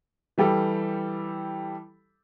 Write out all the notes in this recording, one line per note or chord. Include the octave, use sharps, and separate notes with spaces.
E3 G3 G4 A4